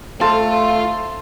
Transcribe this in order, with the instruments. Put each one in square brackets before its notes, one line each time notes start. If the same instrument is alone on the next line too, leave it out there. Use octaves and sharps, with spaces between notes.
[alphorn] A3 [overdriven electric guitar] F4 [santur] A4 C5 [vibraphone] C6